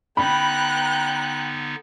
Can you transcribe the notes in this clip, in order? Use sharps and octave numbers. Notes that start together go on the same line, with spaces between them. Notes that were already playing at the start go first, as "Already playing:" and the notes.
D3 B3 D#4 G5 A#5 B5 F#6